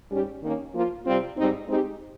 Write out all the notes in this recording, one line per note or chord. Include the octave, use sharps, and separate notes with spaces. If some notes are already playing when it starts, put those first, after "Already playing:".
G#2 G3 C#4 G4
D#3 A#3 C#4
F3 A#3 F4
C3 G3 C4 F4
G#2 G3 C4 D#4
G#3 C4 D#4 G4